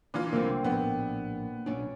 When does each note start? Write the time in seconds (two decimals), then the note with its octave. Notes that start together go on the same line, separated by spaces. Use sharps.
0.14 A#2 E3 D4 F4
0.33 C2 D3 F#3 A3 A#3 C4
0.64 A#1 A2 B3 D4 G4
1.66 B1 A#2 C#4 D4 D5